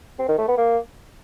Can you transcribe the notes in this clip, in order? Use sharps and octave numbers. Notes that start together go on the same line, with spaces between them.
C4
D#3
A3
B3
A#3